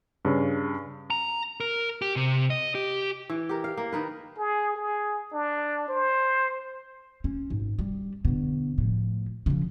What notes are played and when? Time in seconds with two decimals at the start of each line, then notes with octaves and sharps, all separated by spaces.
0.25 G2 C#3
1.10 A#5
1.60 A#4
2.02 G4
2.16 C3
2.50 D#5
2.75 G4
3.30 E3
3.49 G4 A#4
3.64 F5
3.77 A#3
3.93 D#3 A#4 B4
4.38 G#4
4.76 G#4
5.32 D4
5.88 C5
7.24 C#4
7.50 G#1
7.79 G3
8.25 B2 D3
8.78 A2 F3
9.46 C#3 F3